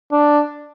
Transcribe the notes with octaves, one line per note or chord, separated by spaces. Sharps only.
D4